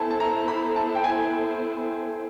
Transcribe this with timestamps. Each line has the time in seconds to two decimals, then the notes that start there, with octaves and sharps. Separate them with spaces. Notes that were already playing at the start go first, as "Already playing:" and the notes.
Already playing: B3 E4 A4 C5 G#5 A5
0.10 A5
0.20 A#5
0.48 B5
0.76 A5
0.95 G5
1.04 G#5